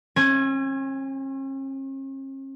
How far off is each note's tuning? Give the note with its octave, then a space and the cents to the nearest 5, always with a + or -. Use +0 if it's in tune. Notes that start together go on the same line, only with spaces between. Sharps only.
C#4 -45 G#5 +0